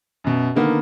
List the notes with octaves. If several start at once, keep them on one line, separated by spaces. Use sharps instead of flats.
F#2 B2
D3 D#3 A#3 B3